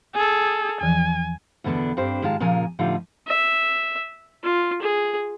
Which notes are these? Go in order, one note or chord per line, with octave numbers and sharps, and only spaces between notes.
G#4 A4 G#5
E2 E3 F3 G#5
E2 B2 D3 B3 D4
G2 C4 D4 G4 C5
G#2 D#3 G#3 F4 A5
A#2 C#3 F3 A#4 G#5
A2 D3 F3 G3 D#4 F4
E5
F4
G#4